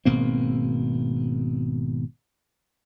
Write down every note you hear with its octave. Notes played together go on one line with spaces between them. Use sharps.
G#1 B2 A#3 C4